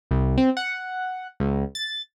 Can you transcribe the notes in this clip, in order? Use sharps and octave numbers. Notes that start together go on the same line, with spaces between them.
C2
C4
F#5
C#2
A6